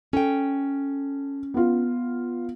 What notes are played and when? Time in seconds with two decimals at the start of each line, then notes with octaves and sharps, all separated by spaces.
0.13 C#4 A4 G5
1.54 B3 F4